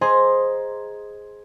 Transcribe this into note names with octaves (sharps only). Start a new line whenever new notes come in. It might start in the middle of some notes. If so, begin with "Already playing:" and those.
G#4 C5 D#5 G#5 A#5 C6